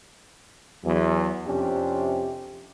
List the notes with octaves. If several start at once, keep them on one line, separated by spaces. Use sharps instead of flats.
E2 F#3
F2 C3 C#4 D4 G4